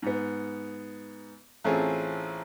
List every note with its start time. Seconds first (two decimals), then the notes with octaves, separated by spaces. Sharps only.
0.02 G#2 B3
1.65 A1 C4 C#4 F4 G#4 A4